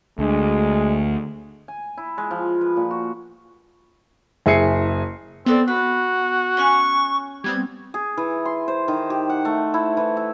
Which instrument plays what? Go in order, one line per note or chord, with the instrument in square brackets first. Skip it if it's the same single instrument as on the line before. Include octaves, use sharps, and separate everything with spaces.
[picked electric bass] D2 [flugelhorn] G#3
[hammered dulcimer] G#5
E4
G#3
F3
B4
A#2
F#4
[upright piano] F#1 E4 G#4 G#5 C7 C#7
[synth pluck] B3 [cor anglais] C4 [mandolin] D#4 A4 D5
[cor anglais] F#4 [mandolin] B4
[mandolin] C#4 G#5 F#6 [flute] C#6
[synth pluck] G3 B3 C4 [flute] G#6
[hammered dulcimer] G#4
E3
C6
C5
D#3
G4
F#5
A3
E4
E3
E5